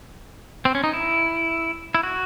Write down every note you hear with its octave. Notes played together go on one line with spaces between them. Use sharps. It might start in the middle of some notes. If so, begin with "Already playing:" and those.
C4
C#4
D#4
E4
E4
F#4